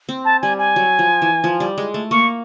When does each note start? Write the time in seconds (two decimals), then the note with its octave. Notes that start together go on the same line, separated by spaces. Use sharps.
0.09 C4
0.25 A5
0.42 G3 G#5
0.59 G#5
0.76 F#3
0.99 F3
1.22 E3
1.44 F3
1.60 G3
1.78 G#3
1.94 A3
2.11 A#3 C#6